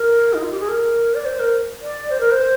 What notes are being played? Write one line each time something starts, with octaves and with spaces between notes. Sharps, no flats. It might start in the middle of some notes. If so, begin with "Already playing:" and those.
Already playing: A#4
D#4
F4
G4
G#4
A#4
D5
C5
A#4
D5
C5
A#4
C5